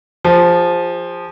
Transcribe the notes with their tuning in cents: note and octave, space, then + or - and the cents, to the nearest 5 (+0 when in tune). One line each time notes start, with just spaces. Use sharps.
F3 +0 G#4 -45